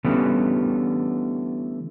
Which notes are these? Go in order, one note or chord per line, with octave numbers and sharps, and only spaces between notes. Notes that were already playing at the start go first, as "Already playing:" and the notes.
D3 E3 G3 A3 B3 C#4